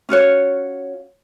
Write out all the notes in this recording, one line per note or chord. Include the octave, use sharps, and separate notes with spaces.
C#4 F4 F#4 C#5